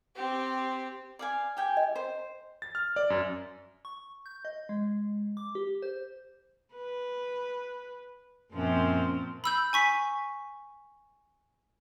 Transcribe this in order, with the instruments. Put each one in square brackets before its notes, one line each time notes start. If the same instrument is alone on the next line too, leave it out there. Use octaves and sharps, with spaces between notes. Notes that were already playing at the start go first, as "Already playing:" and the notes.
[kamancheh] C4 G4
[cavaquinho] D5 F5 G#5
G4 G5 G#5
[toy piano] D#5
[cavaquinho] C5
[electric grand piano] A6
F6
D5
F#2
[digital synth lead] C#6
G6
D#5
G#3
D6
G4
C5
[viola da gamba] B4
[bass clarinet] F#2 [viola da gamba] A#2 F3 C4
[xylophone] B5 E6 G6
G#5 C#6 B6